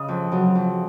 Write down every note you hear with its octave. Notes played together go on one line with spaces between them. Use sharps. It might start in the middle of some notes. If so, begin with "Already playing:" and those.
Already playing: C#3 D#5
F2
C#3 F#3
F2